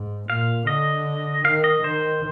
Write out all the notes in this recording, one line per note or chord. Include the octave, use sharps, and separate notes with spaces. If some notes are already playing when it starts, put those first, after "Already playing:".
Already playing: G#2
A#2 F5
D3 D#5
D#3 F5
D#5
D#3 C5